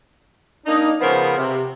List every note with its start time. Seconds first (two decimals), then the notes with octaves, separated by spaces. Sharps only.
0.66 A#3 D4 D#4
1.01 C#3 F3 B3 A#4 C5
1.38 C3